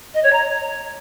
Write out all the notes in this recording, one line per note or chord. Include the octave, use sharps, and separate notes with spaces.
D#5
C#5
A#5